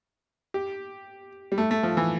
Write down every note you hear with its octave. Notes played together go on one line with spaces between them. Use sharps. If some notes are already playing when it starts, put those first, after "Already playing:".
G4
G3
A3
A3
F3
E3